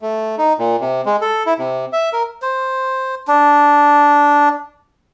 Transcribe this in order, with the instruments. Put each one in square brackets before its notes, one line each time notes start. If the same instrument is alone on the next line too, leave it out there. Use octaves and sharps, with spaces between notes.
[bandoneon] A3
D#4
A#2
C3
G#3
A4
E4
C3
E5
A#4
[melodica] C5
D4